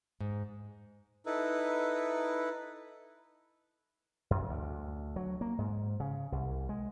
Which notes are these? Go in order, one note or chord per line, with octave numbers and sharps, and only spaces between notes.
G#2
D#4 E4 A4 B4
F#2
D2
F#3
A#3
G#2
C#3
C2
G#3